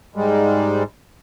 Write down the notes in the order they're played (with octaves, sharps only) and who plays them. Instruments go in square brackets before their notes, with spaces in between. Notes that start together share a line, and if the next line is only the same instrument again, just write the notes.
[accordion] G#2 G3 G#3